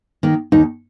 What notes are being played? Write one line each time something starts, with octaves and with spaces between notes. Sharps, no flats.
D#3 A#3
D#2 D#4